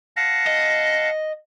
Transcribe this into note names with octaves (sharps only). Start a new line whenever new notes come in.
F5 F#5 A5 A#6
D#5